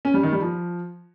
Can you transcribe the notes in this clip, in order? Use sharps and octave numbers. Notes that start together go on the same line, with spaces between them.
C#4
G3
D#3
G3
F3